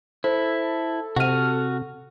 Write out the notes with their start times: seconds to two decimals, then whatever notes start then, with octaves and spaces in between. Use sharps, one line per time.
0.24 E4 A4 C5
1.16 C3 F#4 F#5 F6 D#7